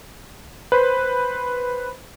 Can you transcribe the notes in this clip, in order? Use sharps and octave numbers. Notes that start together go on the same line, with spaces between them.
B4 C5